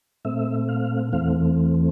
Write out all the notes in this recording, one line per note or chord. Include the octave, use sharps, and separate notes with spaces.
A#2 A3 C4 E5
F5
E2 E3 A3 C4 F5